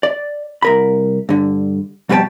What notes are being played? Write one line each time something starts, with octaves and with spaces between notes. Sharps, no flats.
D5
C2 A#4 B5
G2 D3
F2 B2 G3 B4 G5 A5